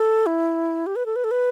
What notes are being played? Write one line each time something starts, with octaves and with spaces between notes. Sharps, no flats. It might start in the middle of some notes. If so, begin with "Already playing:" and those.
Already playing: A4
E4
G4
B4
A4
B4
A4
B4